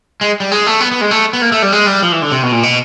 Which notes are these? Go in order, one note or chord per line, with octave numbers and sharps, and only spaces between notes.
G#3
G3
G#3
A3
B3
B3
G#3
A3
B3
A#3
A3
G3
G#3
G3
F3
E3
D3
C3
B2
A#2
B2